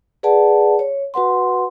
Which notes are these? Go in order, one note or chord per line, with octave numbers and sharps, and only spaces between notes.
G#4 B4 D5 F#5 A5
C#5
F#4 B4 F#5 C6